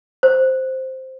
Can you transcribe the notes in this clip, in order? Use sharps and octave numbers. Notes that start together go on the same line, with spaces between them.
C5